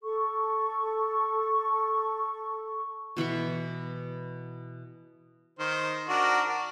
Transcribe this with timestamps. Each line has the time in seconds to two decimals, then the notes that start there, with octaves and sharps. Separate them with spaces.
0.04 A4 C#6
3.17 B2 E3 B5 C#6
5.59 D#3 C5
6.09 D4 F#4 A#4
6.48 D5